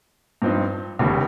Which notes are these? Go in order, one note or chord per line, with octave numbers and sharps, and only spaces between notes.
G2 F3 C4 D#4
F1 D#2 C#3 G3